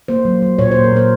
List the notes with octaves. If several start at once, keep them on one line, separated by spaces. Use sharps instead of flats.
A#3 C5
F#3
F#3
A#2 C#5
C5
A#2
A#4
A#2 C5